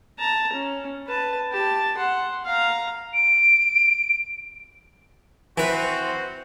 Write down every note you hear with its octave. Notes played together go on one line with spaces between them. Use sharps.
A5 A#5
C#4
B4 A5
G4 A5
F#5 C6
F5 A#5
D7
E3 C4 F#4 B4 C5